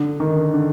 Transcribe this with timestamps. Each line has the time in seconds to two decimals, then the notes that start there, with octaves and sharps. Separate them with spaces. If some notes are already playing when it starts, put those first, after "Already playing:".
Already playing: D3
0.20 D#3
0.53 D3